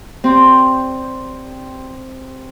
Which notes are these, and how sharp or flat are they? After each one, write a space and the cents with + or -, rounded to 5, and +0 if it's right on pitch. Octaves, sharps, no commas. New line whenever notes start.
C4 +0 G4 +0 D5 -5